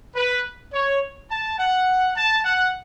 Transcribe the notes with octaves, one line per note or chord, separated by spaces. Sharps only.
B4
C#5
A5
F#5
A5
F#5